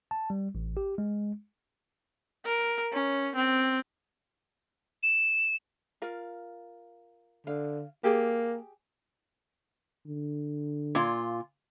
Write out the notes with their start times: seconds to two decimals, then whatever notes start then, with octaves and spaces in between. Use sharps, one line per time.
0.11 A5
0.30 G3
0.55 A1
0.77 G4
0.98 G#3
2.46 A#4
2.92 C#4
3.36 C4
5.03 E7
6.02 F4 A#4 F5
7.47 D3 F5
8.04 A#3 G4 G#4 G#5
10.07 D3
10.95 A#2 F4